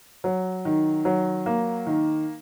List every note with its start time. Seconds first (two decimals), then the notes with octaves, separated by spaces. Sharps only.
0.24 F#3
0.65 D#3
1.05 F#3
1.46 A#3
1.86 D#3